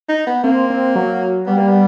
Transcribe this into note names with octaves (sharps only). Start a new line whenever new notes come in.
D#4
B3
A#3 C4
C4
F#3
G3 B3
A#3
B3